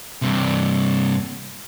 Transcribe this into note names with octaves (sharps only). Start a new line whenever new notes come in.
G2 C3